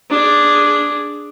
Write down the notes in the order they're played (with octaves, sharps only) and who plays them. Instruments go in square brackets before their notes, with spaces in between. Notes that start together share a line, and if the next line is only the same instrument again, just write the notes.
[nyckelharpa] D4 G#4